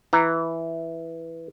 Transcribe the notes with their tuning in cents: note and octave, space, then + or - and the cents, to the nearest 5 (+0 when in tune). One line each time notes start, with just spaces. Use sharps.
E3 +0 A#5 +0